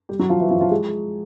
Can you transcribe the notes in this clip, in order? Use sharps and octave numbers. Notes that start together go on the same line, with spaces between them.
G3 G4
F#3 F#4
F3 F4
E3 E4
F3 F4
F3 F4
G#3 G#4